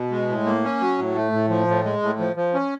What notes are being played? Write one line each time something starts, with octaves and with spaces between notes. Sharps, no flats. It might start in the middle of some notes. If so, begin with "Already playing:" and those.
Already playing: B2
G#3
A2
A#3
C#4
F#3
A2
A3
A2
F3
A2
G#3
A2
F3
F3
C#4